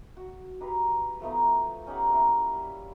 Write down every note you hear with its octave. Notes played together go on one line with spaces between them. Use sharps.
F#4
D#4 G4 B4 F5
F3 A3 B3 D#4
C#4 D#4 G4 F#5
A#3 E4
G3